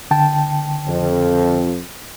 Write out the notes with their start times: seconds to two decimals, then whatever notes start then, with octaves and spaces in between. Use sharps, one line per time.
0.11 D3 G5 A5
0.87 F2